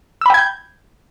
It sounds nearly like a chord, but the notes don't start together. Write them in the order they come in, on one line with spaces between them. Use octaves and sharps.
E6 B5 G5 G#6 G6